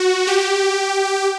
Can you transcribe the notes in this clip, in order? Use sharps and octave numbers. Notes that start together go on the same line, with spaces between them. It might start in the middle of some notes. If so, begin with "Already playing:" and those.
Already playing: F#4
G4